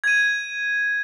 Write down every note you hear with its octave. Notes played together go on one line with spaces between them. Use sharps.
G#6 D#7